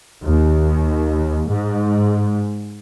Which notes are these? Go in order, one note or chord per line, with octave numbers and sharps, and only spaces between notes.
D#2
G#2